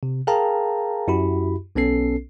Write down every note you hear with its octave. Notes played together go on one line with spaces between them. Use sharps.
C3
G#4 A#4 F5 G5 A5 A#5
F#2 E4 F#4 G4 B5
B1 B3 C#4 A4 C7